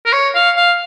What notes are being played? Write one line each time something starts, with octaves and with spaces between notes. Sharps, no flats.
A#4
C#5
F5
F5